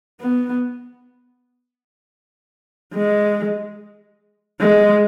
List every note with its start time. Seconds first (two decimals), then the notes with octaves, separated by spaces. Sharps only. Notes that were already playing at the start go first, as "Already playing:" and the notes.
0.20 B3
2.95 G#3
4.60 G#3